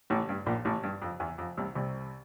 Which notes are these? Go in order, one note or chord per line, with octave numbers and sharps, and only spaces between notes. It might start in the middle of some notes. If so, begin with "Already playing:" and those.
A1 A2
G2
A#1 A#2
A1 A2
G2
F2
E2
F2
C2 C3
C2 C3